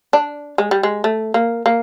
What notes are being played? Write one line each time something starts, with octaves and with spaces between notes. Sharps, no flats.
D4
G#3
G3
G#3
A3
A#3
A#3